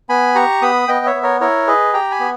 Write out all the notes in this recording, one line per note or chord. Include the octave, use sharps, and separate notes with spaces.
B3 G#5 B5
G4 A#5 C#6
B3 B5 D#6
B3 D#5 G5
C#5 E5
B3
A#4 C#5
E4 A#4 C#5
G#4 B4 D#5
G4 G5 A#5
G#5 B5
B3